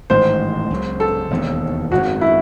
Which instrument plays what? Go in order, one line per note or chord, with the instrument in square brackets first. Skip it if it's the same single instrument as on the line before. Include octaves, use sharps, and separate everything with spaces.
[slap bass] A1 G#2 D#3 G#3 [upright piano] C5
[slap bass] C#2 C#3 F#3
[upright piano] A4
[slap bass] E1 D#2 C#3
[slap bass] G#1 F#2 C#3 [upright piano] F#4
[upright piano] E4